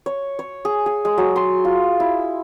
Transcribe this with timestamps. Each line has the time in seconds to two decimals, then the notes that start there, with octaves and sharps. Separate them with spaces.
0.06 C#5
0.39 C#5
0.65 G#4
0.86 G#4
1.05 G#3
1.18 F#3
1.36 C6
1.65 F4
2.00 E4